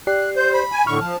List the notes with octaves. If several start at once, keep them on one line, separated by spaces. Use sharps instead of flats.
G4 D5 F#6 C7
C5 G6
B5
G#5
A2 D3 C#6 F6
F3 A5